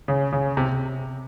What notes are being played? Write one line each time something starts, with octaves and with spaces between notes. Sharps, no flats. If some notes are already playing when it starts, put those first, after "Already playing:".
C#3
C#3
C3